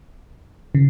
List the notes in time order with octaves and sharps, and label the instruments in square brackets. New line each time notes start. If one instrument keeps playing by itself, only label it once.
[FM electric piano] C#3